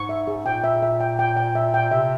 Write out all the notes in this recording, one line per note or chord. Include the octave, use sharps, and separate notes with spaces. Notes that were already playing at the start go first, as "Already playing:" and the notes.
Already playing: G#2 C#6
E5
G#4
A#2 G5
E5
E5
G5
G5
G5
E5
G5
C3 E5